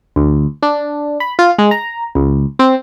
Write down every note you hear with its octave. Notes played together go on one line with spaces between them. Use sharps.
D2
D4
B5
F4
G#3
A#5
C#2
C4